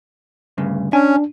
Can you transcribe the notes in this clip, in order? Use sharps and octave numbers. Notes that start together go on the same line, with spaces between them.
D2 G2 C#3
C#4 D4 G#5